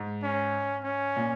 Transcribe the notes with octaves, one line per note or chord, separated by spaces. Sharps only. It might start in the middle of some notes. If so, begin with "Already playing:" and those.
Already playing: G#2
C#4
C#4
A#2